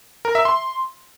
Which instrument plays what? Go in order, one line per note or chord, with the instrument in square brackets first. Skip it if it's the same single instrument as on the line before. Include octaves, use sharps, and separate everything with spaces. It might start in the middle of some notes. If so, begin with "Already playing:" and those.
[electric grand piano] A#4
E5
C6